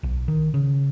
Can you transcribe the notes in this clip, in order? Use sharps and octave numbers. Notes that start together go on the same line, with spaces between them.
B1
D#3
C#3